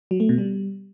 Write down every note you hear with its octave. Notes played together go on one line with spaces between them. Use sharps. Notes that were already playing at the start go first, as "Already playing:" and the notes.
F#3
A3
B2
G3